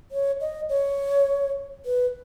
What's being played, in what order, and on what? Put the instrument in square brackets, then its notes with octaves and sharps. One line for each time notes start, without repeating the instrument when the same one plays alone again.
[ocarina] C#5
D#5
C#5
B4